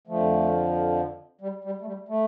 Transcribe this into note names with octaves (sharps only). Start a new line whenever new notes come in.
F2 D3 F3 A3
G3
G3
A3
G3
A3